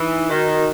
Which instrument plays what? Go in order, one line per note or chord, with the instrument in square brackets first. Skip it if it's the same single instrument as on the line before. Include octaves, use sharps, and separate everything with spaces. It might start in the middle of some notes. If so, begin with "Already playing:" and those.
Already playing: [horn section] E3 [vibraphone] D#4
[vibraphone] D#4
[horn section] D#3 [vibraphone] F#4
[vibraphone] A#4